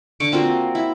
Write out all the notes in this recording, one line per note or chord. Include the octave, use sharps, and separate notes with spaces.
D3 C#6 D6
A#3 C4 F4 F#4
E4